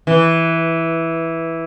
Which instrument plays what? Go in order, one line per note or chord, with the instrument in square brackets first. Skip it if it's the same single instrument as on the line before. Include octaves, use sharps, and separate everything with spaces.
[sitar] E3